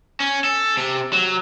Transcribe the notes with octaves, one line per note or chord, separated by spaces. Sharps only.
C#4
A4
C3
F#3